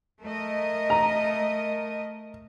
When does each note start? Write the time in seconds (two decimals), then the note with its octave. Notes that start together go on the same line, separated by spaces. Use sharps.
0.22 A3 A#4 D#5
0.90 A#5